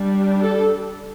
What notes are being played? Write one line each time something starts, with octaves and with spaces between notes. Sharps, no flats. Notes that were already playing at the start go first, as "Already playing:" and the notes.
Already playing: G3 D4
A4